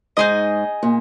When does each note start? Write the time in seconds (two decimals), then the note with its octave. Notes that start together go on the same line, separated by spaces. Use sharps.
0.17 G#2 D#4 G#4 D#5
0.83 A#2